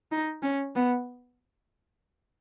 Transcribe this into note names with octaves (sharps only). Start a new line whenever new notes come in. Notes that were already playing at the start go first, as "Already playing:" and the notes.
D#4
C#4
B3